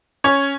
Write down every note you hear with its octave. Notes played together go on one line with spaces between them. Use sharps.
C#4 C#5